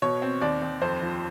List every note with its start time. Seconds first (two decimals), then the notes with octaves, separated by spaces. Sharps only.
0.02 B2 C#5
0.22 C4
0.41 D#2 D5
0.62 D#2
0.82 F2 C5
1.02 F3